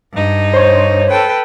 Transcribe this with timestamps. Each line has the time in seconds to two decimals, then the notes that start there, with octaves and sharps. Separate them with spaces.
0.13 G2 D#4
0.53 C5 C#5
1.09 A4 B4 G5